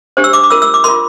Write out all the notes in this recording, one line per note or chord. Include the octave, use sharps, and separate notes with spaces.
D4 G4 C5
E6
D6
D6
F4 A#4 E6
E6
D6
F4 A#4 C6